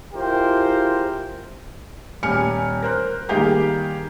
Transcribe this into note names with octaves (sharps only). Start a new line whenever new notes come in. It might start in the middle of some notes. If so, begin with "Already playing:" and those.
E4 F4 G4 G#4 A#4 C5
D#1 G4 G#5 F6 C#7
A#4 C5 F#6
D#3 G3 A#3 D#4 G4 G#4